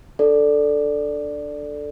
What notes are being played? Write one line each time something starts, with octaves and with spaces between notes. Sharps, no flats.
D4 A4 D5